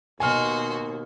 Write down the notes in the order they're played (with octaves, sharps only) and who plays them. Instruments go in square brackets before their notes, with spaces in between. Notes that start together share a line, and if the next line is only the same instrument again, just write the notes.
[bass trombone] D#2 [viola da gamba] B2 [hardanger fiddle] F#4 C6 [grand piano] G#5 F6